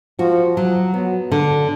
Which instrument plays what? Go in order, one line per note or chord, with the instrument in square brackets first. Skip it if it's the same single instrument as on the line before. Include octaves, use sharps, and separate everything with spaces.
[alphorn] F3 [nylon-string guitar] F#4
[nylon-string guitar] F#3
[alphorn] F#3 [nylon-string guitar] B3
[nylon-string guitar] D3